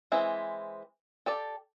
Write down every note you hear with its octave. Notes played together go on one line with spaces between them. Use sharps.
E3 G#3 C4 E4
G4 A4 D5